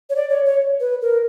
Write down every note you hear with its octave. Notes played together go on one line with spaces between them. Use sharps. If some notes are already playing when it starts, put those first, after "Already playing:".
C#5
D5
C#5
C#5
B4
A#4